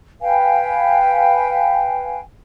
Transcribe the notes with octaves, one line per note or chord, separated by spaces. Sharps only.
B4 F5 G5 G#5